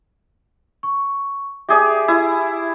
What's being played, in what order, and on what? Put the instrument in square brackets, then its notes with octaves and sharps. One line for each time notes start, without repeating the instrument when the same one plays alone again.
[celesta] C#6
[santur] G4 G#4 D5 [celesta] E5 D6 D#6
[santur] E4